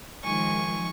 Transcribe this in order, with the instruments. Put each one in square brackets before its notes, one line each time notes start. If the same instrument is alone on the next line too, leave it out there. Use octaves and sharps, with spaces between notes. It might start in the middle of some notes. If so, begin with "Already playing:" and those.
[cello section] D#3 F3 G#3 [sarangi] G#5 [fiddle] C#6